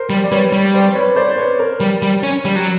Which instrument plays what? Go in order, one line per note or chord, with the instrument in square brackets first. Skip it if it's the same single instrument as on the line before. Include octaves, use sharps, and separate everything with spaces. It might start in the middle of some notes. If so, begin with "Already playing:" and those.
Already playing: [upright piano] A#4 C5
[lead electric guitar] G3
[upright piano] D5
[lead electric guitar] G3 [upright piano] B4 C#5
[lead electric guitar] G3
[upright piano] C5 D5
B4 C#5
C5 D5
C5
B4 C#5
A#4 C5
[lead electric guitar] G3
G3
C#4
G3
F#3